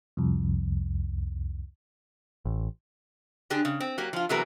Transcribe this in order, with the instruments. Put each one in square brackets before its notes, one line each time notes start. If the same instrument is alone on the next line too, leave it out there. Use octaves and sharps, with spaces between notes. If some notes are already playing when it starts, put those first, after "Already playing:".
[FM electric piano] C2 F2
[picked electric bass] A1
[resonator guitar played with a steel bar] D3 D4 G4 G#4
C#3
C4
F#3 A#3 G4
F3 F4
C3 E3 F#3 B3 G#4 A#4